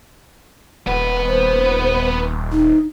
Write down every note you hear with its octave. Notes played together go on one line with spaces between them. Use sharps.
D#1 B3 B4 F#5
C5
D#4